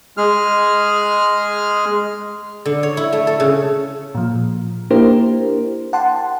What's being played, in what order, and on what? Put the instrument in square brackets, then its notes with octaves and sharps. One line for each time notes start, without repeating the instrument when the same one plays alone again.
[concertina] G#3 G#4 F6
[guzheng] D3
C#5
E4
A3
A4
C#3
[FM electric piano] A#2 F3
A#3 D4 E4 G4 A#4 C5
F#5 G5 A5 C6